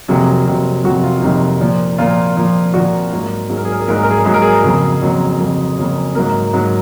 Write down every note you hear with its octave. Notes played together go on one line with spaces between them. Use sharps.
F2 C3 F#3 A#3 G#4
F2 C3 F#3 A#3
F2 C3 F#3 A#3 F#4
F4
F4
F2 C3 F#3 A#3 D#4
A#2 F3 A#3
A#2 F3 A#3 F4
A#2 F3 A#3
A#2 F3 A#3 F#4
G#2 F#3 A#3
G#2 F#3 A#3 G#4
A#4
G#4
A#4
G#4
G#2 F#3 A#3 A#4
G#4
A#4
G#4
A#4
G#2 F#3 A#3 G#4
A#4
G#4
F2 C#3 F#3 A#3 G#4
F2 C#3 F#3 A#3
F2 C#3 F#3 A#3
F2 C#3 F#3 A#3
G#2 F#3 A#3 A#4
G#2 F#3 A#3